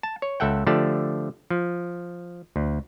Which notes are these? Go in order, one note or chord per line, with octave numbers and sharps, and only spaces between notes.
A5
C#5
C#2 A4 E5 F#5 G5
D3 F3 A3 G4 D5 A5
F3
D2